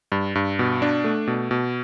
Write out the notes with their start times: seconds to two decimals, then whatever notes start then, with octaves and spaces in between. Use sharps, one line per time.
0.12 G2
0.35 G2
0.59 B2
0.82 D4
1.04 A3
1.27 B2
1.51 B2